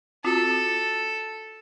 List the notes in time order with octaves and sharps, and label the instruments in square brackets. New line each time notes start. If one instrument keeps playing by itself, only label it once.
[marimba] C4 F4 F#4 [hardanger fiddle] A4